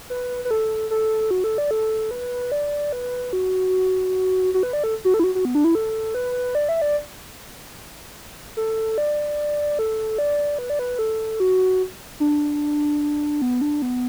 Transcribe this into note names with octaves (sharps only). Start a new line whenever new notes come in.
B4
B4
A4
A4
F#4
A4
D5
A4
B4
D5
B4
F#4
F#4
B4
D5
A4
F#4
A4
E4
F#4
F#4
B3
D4
E4
A4
B4
D5
E5
D5
A4
D5
A4
D5
B4
D5
B4
A4
F#4
D4
B3
D4
B3